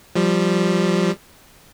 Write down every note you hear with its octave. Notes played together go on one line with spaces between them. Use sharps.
F3 G3